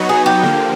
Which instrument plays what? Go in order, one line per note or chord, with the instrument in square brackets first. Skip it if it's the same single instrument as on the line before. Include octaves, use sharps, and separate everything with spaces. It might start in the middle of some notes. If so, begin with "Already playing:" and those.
Already playing: [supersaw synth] F#3 B3 D#4 F#4
[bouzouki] G#4
G4
[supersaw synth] D3 F3 A#3